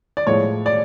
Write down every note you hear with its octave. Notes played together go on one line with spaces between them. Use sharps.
D5
A2 F3 G#3 C#5
D5